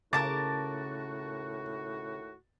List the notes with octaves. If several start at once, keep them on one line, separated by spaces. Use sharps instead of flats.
D#2 A2 C#3 F#4 A#4 A5 D6 A6